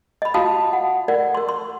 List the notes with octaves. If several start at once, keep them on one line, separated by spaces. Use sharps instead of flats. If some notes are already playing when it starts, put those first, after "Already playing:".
D#5 B5
F4 F#4 F5 A5 B5 D#6
F#5
A#4 D5 F#5
A#4 C6
C6